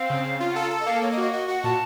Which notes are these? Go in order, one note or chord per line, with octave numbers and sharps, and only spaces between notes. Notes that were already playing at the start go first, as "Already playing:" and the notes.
Already playing: C4 F5
C#3
C#3
F4 F5
F#5
A4 A#5
A4 A5
D#5
A#3 F5
A#3 C#5
D#5
F#4
D#5
F#4 D#5
F#4 F#5
A#2 A5